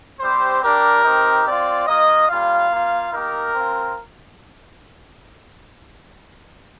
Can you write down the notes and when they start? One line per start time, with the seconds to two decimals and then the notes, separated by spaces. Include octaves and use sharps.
0.20 G3 C4 G4 C5
0.62 G3 D4 G4 A#4
1.04 C4 D#4 G4
1.45 C4 F4 D5
1.87 A#3 F4 D#5
2.29 G3 A#3 F4 F5
2.71 A#3 F4
3.12 A#3 D#4 G4 A#4
3.54 C4 F4